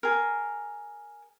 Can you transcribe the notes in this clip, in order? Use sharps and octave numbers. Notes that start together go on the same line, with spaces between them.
G#4 A#4